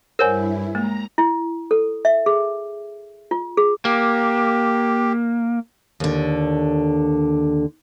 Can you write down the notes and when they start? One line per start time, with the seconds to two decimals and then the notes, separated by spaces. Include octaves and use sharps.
0.19 G2 E4 A#4 C5 C#5 F#5 G#5
0.75 G#3 A#3 A#5
1.18 E4
1.71 A4
2.05 E5
2.26 G#4
3.31 F4
3.57 G#4
3.85 A#3 G4
6.00 D#2 D3